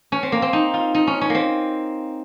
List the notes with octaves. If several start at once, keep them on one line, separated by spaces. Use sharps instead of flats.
C#4
C4
A#3
C4
D#4
F4
D#4
C#4
C#4
A#3 C4